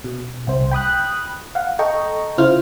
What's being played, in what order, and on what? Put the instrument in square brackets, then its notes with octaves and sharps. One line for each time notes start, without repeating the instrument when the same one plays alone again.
[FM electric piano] B2
C2 C5
G5 B5 D#6 F#6
F5 F#5
A4 D#5 G5 A#5 C#6
C#3 E4 F4 C5 F6